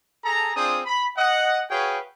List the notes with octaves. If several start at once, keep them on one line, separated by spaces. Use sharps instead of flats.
G#4 A4 A5 A#5
C4 D4 F4 G#4 C5 D#6
B5
D#5 F#5
F#4 G#4 B4 C#5 F5 G5